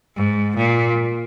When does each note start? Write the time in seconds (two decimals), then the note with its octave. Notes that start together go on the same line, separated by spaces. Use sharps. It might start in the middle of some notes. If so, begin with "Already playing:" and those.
0.18 G#2
0.57 A#2